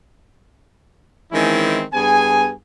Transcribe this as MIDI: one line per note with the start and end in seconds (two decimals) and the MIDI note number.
1.32 1.83 51
1.32 1.83 52
1.32 1.83 56
1.32 1.83 60
1.32 1.83 61
1.32 1.83 64
1.93 2.52 43
1.93 2.52 59
1.93 2.52 68
1.93 2.52 80